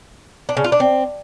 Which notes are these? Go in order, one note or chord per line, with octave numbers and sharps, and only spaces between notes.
D4
C#3
F4
D4
C4